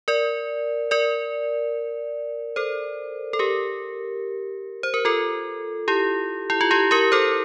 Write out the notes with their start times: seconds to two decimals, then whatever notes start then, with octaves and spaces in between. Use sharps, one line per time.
0.08 A#4 D5
0.91 A#4 D5
2.56 A4 C5
3.33 A4
3.39 G4 A#4
4.83 C5
4.94 A#4
5.05 F4 A4
5.88 E4 G4
6.50 E4
6.61 F4
6.71 E4 G4
6.91 G4 A#4
7.12 A4 C5